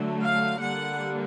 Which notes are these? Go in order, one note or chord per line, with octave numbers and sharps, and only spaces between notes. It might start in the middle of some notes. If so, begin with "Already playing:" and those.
Already playing: D3 F#3 A3
F5
D3 G3 A#3 F#5